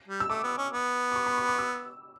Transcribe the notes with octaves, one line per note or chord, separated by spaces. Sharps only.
G3
E6
A3 D6
B3
C#4
B3
D6
C#6
B5
C#6
D6
E6